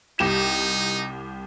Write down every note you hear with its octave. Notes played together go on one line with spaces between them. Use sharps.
C2 D#4 G4 E7